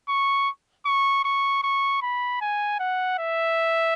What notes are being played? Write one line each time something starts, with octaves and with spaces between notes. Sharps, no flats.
C#6
C#6
C#6
C#6
B5
G#5
F#5
E5